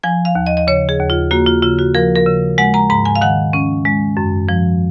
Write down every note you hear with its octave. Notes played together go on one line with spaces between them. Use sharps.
F3 G#5
F5
D#2
D#5
D#5
C#3 C#5
G#4
D#2
F4
A#3 F#4
F4
C#3 F4
F#4
F3 A#4
A#4
C#3
G#3 F#5
A#5
G#2 A#5
G#5
F5
D#3 F#5
C#4
G#3
F#2
F3